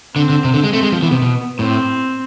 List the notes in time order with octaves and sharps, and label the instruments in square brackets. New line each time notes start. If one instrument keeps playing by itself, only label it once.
[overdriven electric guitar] D3 [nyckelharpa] C4
[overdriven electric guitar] D3
C3
D3
G#3
[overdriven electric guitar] A3 [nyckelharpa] C4
[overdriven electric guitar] G#3
F3
[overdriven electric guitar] E3 [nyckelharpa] B3
[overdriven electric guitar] C3
B2
[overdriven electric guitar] A2 [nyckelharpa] C4